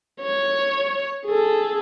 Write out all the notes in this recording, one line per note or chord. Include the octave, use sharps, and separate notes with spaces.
C#5
G#4 A4